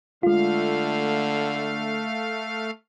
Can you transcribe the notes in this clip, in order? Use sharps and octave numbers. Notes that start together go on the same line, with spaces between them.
D3 G#3 A3 F4 F5